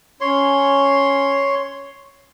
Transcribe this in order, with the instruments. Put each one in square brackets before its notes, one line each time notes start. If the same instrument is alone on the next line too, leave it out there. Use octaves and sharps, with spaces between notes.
[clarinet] C#4 [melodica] C#5 C6